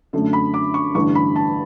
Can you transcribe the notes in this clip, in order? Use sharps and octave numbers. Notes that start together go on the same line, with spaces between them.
F#2 D3 A3
B5
D6
C#6
A1 G2 D3 C#6
B5
A5